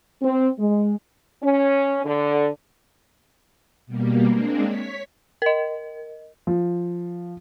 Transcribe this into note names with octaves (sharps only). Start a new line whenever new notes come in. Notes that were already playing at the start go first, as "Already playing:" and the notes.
C4
G#3
C#4
D3
B2 G3 A#3
G#3 A#3 C4 D4
C#5 B6
A#4 D#5
F3